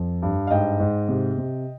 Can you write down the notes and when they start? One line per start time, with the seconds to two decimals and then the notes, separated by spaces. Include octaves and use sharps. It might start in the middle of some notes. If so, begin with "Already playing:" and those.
Already playing: F2
0.22 G2
0.47 F5
0.51 G#2 D#5 G5
0.80 G#2
1.09 C3
1.38 C3